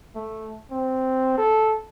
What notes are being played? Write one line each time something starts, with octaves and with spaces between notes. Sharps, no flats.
A3
C4
A4